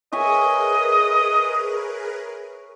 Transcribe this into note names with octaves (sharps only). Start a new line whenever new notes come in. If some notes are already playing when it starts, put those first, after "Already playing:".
G#4 A#4 B4 C#5 D#5 E5 G#5